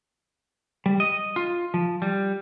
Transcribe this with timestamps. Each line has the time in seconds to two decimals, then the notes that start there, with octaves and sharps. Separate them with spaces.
0.86 G3
1.00 D#5
1.36 F4
1.74 F3
2.02 G3